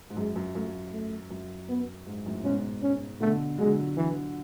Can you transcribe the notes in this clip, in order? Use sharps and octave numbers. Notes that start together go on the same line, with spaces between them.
G#2
F#2 G#3
F#2
F#2 A3
A3
F#2
B3
G#2
F#2 A2
G#2 B2 C#4
C#4
B2 D3 A3
D3 F#3 G#3
E3